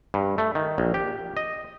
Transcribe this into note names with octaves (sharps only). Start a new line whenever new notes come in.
G2
A3
D#3
A#1
G4
D#5